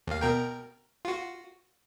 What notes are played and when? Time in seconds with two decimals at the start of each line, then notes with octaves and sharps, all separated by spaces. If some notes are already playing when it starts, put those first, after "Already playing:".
0.07 D#2 F5
0.21 B2 A#4 G5
1.05 F4 F#4